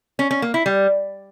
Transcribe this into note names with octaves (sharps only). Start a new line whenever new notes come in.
C#4
C#4
A#3
E4
G3